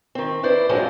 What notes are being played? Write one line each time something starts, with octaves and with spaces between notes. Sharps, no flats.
D#3 C4
E4 B4 C5 D5
F#2 F3 F#3 G#3 C4 D4